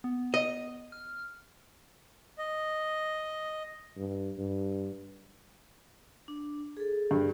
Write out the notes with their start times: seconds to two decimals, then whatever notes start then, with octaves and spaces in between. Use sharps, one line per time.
0.04 B3
0.34 D#5
0.92 F6
2.38 D#5
3.97 G2
4.38 G2
6.28 D4
6.77 G#4 A4
7.11 G2